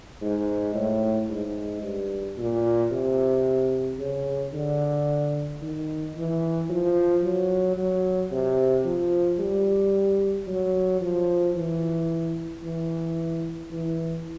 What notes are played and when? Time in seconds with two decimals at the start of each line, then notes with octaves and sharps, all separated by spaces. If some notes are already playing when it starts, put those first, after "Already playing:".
0.21 G#2
0.75 A2
1.30 G#2
1.83 G2
2.37 A#2
2.91 C3
3.99 C#3
4.53 D3
5.62 D#3
6.15 E3
6.70 F3
7.23 F#3
7.77 F#3
8.31 C3
8.85 F3
9.39 G3
10.47 F#3
11.01 F3
11.55 E3
12.63 E3
13.71 E3